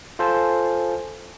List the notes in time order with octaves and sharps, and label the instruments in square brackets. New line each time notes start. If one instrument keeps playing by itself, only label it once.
[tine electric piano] F4 A4 C5 G#5 A5